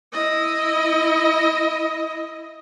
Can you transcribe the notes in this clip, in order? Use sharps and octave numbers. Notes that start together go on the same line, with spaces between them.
E4 D#5